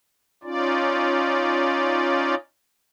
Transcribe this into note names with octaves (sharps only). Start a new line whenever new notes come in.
C#4 D#4 F4 D5